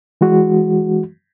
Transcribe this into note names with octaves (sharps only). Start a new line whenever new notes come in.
E3 G#3 F#4